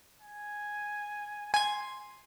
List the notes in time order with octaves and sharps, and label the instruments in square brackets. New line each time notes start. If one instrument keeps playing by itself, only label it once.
[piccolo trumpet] G#5
[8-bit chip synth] G#5 G#6 [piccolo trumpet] C6